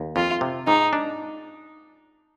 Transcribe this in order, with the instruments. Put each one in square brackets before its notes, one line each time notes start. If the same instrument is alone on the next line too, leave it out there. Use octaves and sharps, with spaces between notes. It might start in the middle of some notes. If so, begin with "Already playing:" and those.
Already playing: [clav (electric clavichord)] D#2
[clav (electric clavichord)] F2 [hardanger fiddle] F4
[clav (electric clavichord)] C3
[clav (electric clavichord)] G#2 [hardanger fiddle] D#4
[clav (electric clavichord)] D4